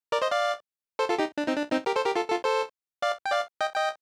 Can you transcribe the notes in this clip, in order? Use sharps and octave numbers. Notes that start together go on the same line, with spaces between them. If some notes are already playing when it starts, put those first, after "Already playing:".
A#4 D5
C5 D#5
D5 F5
A4 C5
F4 A4
D#4 G4
D4
C4 D#4
D4
C4 D#4
G4 A#4
A4 C5
G4 A#4
F4 A4
F4 A4
A4 C5
D5 F5
G5
D5 F5
D#5 G5
D#5 G5